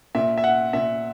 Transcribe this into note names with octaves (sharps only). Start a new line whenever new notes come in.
A#2 E5
E5
F#5
A#2 E5